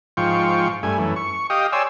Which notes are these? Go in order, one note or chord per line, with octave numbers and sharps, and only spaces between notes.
G#2 F3 F4 G5 C#6
G2 A3 G#5
F#2 E3 A3
C#6
G4 D#5 F5 G5 D#6
C#5 D5 G5 G#5 C6 E6